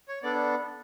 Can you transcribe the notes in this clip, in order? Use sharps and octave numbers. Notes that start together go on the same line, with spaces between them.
C#5
B3 D4 A4 D5